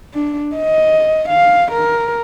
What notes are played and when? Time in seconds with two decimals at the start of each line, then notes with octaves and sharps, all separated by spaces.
0.14 D4
0.56 D#5
1.29 F5
1.72 A#4